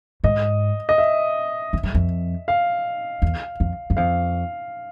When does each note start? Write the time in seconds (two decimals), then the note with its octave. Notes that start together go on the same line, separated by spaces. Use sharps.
0.24 G#2 D#5
0.89 D#5
0.98 E5
1.73 F2
1.83 F#2
1.94 F2
2.48 F5
3.22 E2
3.60 F2
3.90 F#2
3.97 F2 F5